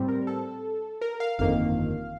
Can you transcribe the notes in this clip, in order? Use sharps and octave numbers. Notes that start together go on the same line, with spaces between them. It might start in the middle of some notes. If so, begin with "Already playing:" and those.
Already playing: A2 G3 C4
A#4
A4
A#4
F5
G1 F2 D#3 A#3 F5